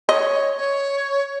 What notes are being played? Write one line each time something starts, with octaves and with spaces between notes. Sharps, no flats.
C#5 D#5
C#5